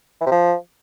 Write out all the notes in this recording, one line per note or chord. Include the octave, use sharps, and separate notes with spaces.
E3
C3
F3